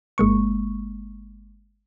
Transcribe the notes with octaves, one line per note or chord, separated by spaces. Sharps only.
G1 G#3 A#3 C#6